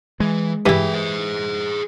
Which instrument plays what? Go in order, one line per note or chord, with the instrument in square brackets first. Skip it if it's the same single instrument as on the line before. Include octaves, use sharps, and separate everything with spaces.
[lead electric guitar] E3 [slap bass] G#3
[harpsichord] G2 [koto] E3 E4 [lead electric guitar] G#4 G5
[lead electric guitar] G#4 C5